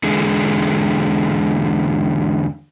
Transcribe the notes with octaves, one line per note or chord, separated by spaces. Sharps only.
E2 D3 G#3